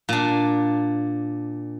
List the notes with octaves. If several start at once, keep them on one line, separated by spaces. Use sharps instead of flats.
A#2 D4